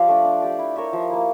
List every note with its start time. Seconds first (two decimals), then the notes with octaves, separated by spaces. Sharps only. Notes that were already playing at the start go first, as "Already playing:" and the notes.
Already playing: F3 G4 D5 F5
0.08 A3 D4
0.25 D4
0.42 G4 D5
0.59 E4
0.76 A#4 C#5 E5
0.93 F3
1.10 A#3 E4